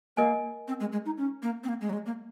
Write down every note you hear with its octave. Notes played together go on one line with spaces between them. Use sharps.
A#3 A#4 D#5 G#5
C4
G#3
G#3
D#4
C#4
A#3
C4
A#3
G#3
F#3
G#3
A#3